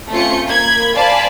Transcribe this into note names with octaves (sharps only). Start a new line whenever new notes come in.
A3 C4 C#4 F4 G6 C#7
A#3 B5 G#6
C5 D5 F5 G#5 A5 B5